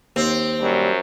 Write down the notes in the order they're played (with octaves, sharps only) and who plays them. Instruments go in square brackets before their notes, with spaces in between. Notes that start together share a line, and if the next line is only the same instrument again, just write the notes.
[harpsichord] D#2 [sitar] C4
[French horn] F#2 [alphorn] G3